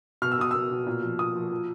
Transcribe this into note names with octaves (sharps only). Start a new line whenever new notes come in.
B2 F6
E6
B2 D#6
B2 E6
B2
A#2
F3
A#2 D#6
F3
F3